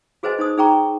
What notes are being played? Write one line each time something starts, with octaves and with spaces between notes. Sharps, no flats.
F#4 G#4 B4 C5 D#5 G#5
D#4 C5 D#6
D#4 G#4 G5 A#5 C#6